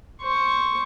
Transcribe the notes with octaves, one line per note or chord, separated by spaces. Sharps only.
C5 C#6